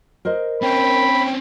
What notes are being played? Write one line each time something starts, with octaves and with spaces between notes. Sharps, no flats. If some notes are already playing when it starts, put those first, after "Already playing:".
A#4 C5 D#5
C4 C#4 G5 B5